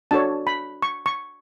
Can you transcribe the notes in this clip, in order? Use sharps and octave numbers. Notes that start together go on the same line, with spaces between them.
D4 F#4 A4 C#5 A5
B5
C#6
C#6